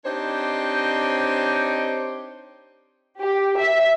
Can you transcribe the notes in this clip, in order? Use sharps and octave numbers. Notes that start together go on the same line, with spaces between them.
C4 D4 D#4 G4 C5 C#5
G4
E5